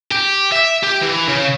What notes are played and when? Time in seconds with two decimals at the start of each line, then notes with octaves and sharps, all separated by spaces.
0.12 G4
0.52 E5
0.83 G4
1.01 E3
1.28 C#3